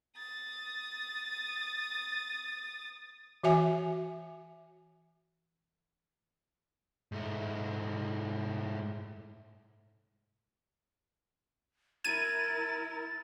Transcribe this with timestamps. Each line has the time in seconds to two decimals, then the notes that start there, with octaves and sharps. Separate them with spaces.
0.17 D#6 A6
3.43 E3 F#4 E5 G#5
7.12 G#2 A3
12.05 E4 A#4 G#6 A6 D#7